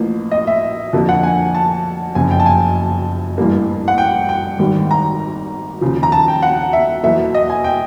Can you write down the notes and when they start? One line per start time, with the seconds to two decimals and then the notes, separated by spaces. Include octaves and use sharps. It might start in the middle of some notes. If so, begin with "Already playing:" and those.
Already playing: A1 A2 F3 A#3
0.31 D#5
0.47 E5
0.93 F2 D3 F3 A#3
1.09 F#5
1.23 G#5
1.55 A5
2.15 F#1 F2 C#3 G#5
2.31 G5
2.40 A5
2.46 G#5
3.38 A1 G2 E3 G3 A#3
3.88 F#5
3.98 G5
4.29 G5
4.59 G#1 G#2 D#3 G3
4.91 A#5
5.81 D#2 C#3 F3
6.03 A#5
6.12 A5
6.28 G5
6.42 F#5
6.73 E5
7.03 E2 B2 F#3 A#3 E5
7.35 D#5
7.50 G#5
7.64 G5